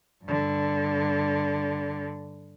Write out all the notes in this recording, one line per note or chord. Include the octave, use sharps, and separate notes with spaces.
G2 D3